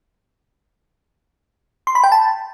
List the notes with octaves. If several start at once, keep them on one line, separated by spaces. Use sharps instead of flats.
C6
B5
G5
A5